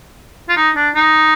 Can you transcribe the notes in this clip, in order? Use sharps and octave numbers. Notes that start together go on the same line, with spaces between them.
F4
D#4
D4
D#4